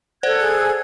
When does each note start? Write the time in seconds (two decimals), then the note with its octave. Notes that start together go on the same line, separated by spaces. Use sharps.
0.23 A4 C5 D5 F#5 F#6 G#6
0.40 G#4